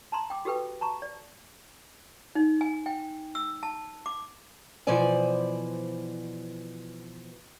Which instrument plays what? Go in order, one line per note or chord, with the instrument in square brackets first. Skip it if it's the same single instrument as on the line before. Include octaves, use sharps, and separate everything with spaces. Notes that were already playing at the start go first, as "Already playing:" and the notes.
[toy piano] A5 A#5 C6
G5 D6
F#4 G4 A4 B4 G5
A5 A#5 C#6
D5
D#4
G#5
G5
E6
A5
D6
[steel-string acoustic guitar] B2 E3 F3 C5 D5 G#5